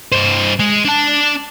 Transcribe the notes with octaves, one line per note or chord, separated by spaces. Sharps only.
G2 C5
G#3
D4 A5